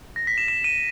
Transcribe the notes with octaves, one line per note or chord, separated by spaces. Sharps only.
A#6
B6
E7
E7
D#7